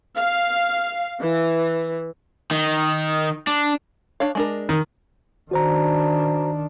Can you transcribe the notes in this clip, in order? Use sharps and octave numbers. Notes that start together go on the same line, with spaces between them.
F5
E3
D#3
D4
D4 C#5 F5
G#3 D4 A#4
D#3
D#3 D4 F#4 C5 A#5